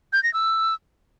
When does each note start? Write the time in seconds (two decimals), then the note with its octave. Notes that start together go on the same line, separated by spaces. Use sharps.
0.13 G6
0.23 A#6
0.34 E6